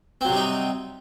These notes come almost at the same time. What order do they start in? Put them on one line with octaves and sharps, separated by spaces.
C4 F#3 C3 G3 D#4